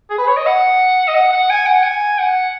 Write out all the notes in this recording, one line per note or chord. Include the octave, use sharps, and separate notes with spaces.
G#4
B4
C#5
D#5
F#5
D#5
F#5
F#5
G#5
F#5
G#5
F#5